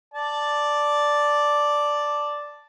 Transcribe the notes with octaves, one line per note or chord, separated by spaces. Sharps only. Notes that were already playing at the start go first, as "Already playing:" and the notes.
D5 A5